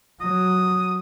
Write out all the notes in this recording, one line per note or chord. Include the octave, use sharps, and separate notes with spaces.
F#3 D#6